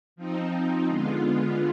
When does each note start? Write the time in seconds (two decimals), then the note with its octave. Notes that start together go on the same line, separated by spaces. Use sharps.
0.16 F3 C4 D#4
0.86 D3 G#3 B3 F4